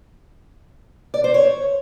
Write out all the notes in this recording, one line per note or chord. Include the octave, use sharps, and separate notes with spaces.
D5
C5
C#5